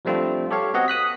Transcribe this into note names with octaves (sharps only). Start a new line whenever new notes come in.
F3 G3 A3 C4 D4 F4
G4 A4 C#5 F5
B3 C4 F#4 D#5 F#5
D#6 F#6 B6